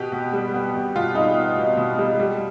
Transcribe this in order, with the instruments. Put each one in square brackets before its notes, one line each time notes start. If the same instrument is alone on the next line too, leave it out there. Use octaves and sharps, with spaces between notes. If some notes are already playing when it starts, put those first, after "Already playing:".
Already playing: [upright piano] B2 B3 G4
B2
G3
B3
B2
B2 F4
G3 D#4
B3
B2
B2
G3
G3